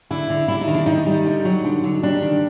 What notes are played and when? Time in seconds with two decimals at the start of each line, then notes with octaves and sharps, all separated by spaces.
0.10 D3 E4
0.30 D3
0.48 G3 E4
0.61 D#4
0.68 D#3
0.74 D4
0.86 D#3 D#4
1.06 G3
1.26 D3
1.45 F#3
1.65 D3
1.84 D3
2.03 G3 D4
2.22 D#3